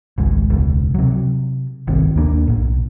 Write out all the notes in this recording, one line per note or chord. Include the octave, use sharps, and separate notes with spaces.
G#1 C#2 G#3
E1 C#2
C3 F#3
G1 C2 D#3 C4
D#2 A#3 D4
B1 A2